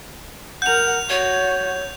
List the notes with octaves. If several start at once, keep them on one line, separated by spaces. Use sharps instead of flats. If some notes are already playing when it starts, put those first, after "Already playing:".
A#4 F#5 G6 F7
F#4 C#5